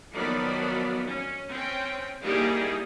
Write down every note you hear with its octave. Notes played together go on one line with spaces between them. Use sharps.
D#3 F3 F#3 B3 D5 B5
C#4
C4 C#4 G5
G3 A#3 D#4 E4 G4 G#4